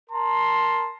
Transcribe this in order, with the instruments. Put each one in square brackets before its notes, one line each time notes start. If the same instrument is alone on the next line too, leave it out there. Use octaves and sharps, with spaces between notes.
[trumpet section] A#4 A5 A#5 C6